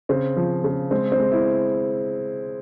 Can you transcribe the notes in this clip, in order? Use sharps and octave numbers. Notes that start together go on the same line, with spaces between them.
C#3 C4
F3
C#3
G#3 C4
C4
G#3
E4